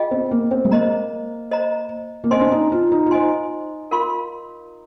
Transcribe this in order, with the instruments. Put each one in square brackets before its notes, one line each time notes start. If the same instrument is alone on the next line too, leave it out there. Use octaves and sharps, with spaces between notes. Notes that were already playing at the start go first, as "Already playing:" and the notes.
Already playing: [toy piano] F4 G#4 D#5 G5
[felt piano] C4
A#3
C4
G#3
[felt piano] A#3 [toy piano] C5 D#5 A#5
[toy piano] C5 D#5 A#5
[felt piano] A#3
[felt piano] C4 [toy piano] C5 D#5 G#5 C6
[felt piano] D4
D#4
F4
D#4
F4
[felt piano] D#4 [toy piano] C5 D#5 G#5 C6
[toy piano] F4 A#4 F5 C6